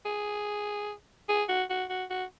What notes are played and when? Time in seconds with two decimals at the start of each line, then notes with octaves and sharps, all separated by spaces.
0.05 G#4
1.29 G#4
1.49 F#4
1.70 F#4
1.90 F#4
2.10 F#4